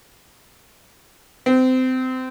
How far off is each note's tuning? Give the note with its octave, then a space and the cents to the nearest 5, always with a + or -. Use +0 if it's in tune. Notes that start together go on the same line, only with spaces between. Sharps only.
C4 -25